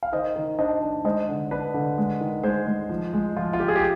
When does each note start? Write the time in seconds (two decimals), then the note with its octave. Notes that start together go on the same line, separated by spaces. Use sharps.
0.03 F5
0.12 D#3 C5 D#5
0.36 D#3
0.59 D4 C5 D#5
0.82 D4
1.04 G#3 C5 D#5
1.29 D3
1.51 D4 B4 D5
1.74 D3
1.98 G#3
2.21 D#3
2.43 G#3 G#4 C5
2.67 G#3
2.89 F3
3.13 G#3
3.36 F3 F4
3.53 F4
3.59 F3 G4
3.68 G#4
3.75 G4